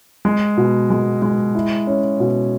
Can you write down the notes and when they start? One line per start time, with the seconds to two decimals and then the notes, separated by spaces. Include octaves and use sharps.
0.25 G#3
0.57 B2
0.90 G#3
1.22 G#3
1.55 E4
1.87 C#4
2.20 B2